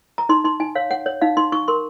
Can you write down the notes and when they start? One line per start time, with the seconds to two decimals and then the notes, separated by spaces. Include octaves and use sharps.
0.18 A#5
0.29 D#4 C6
0.44 D#4 C6
0.60 D#4 G#5
0.75 C#5 F5
0.91 C#5 F#5
1.06 C#5
1.21 D#4 F5
1.37 D#4 C6
1.52 D#4 C#6
1.68 A#4 C6